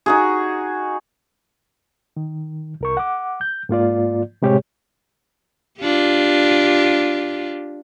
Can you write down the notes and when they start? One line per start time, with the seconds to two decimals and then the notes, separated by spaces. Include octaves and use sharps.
0.06 D#4 F#4 G#4
2.17 D#3
2.81 C2 A#4 C#6
2.97 F#5 D6
3.41 G6
3.69 G#2 A#3 F4 D5
4.42 A2 C3 G#3 G4 G#4 C#5
5.81 D4 F4 G4